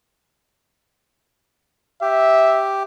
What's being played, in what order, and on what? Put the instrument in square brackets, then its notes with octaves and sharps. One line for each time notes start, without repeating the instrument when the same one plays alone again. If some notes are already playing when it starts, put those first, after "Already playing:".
[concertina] G4 [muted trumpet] E5